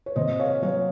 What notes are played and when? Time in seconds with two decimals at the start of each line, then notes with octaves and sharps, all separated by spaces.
0.06 C#5
0.16 C3 C5 D#5
0.39 C#5 F5
0.62 F#3 C#5 F5